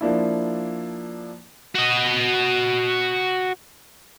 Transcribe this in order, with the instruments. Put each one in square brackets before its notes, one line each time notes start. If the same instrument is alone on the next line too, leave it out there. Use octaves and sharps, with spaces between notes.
[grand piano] F3 A#3 D4 E4
[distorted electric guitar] F#4 D#5